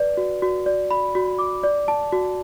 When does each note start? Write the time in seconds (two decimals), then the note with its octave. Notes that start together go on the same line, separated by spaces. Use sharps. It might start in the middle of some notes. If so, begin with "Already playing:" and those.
Already playing: B4 D5
0.17 F#4
0.42 F#4
0.66 D5
0.91 B5
1.15 F#4
1.39 D6
1.64 D5
1.88 A5
2.13 F#4